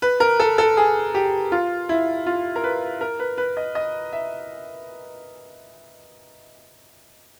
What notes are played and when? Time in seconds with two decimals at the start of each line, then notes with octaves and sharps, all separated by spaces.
0.02 B4
0.20 A#4
0.40 A4
0.58 A4
0.77 G#4
1.15 G4
1.52 F4
1.89 E4
2.26 F4
2.56 A#4
2.64 B4
3.01 A#4
3.19 B4
3.38 B4
3.57 D#5
3.75 D#5
4.13 E5